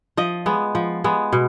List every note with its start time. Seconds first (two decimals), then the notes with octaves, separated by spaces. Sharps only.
0.17 F3 D#5
0.46 G#3 B3
0.75 F3
1.04 G#3 B3
1.33 B2